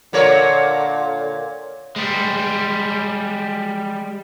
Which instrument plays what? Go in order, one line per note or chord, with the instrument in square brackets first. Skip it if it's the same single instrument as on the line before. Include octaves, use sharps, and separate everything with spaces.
[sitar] A#2 A#4 C#5 [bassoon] D3
[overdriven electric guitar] G3 G#3